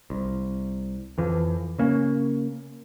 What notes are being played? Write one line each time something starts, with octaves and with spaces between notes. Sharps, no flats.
C2
F2 E3 F3
C#3 A#3 C#4